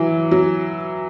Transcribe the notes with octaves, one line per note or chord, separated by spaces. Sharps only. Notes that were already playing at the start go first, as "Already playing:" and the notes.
Already playing: E3 F#3
F#3